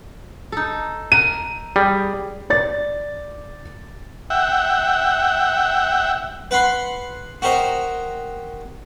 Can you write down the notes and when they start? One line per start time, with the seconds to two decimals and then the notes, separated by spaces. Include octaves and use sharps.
0.52 D#4 A4
1.12 A#4 D#7
1.76 G3 G#4
2.50 D5 A6
4.30 E5 F#5 G5
6.51 B4 F#5 B5 C6
7.42 F#4 G4 A#4 C5 D#5